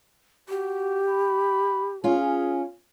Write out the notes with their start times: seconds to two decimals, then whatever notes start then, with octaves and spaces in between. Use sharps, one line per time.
0.49 F#4 G4
1.08 B5
2.04 C#4 F4 G#4